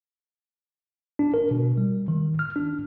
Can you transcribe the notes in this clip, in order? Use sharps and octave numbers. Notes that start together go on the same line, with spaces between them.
D4
A#4
B2
G3
D#3
F6
D4